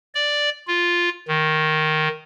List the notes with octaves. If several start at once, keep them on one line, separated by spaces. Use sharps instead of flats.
D5
F4
D#3